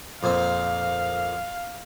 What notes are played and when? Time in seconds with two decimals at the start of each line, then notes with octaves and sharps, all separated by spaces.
0.23 F2 A#2 C4 F5